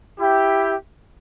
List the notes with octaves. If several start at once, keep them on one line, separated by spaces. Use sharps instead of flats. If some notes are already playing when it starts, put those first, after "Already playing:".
E4 G4